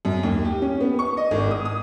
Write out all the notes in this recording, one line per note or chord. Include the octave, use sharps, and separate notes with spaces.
F#2
D#2
G4
C#4
B3
C#6
D#5
G#1
D#6
D#6